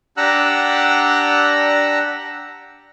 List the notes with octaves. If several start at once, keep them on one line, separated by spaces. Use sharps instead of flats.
D4 G4 F#5 A#5 E6 F#6